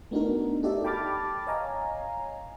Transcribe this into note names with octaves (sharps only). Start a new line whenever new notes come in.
A3 B3 D4 D#4 F#4 A#4
D#4 F#4 G4 A4 D5 E5
G5 A5 B5 D6 F6 A6
C#5 D#5 F5 G#5 A#5